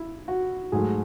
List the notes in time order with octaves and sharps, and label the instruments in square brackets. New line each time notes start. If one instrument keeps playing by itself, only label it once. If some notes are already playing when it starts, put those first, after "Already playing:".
Already playing: [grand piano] E4
F#4
G#2 F#3 A3 G#4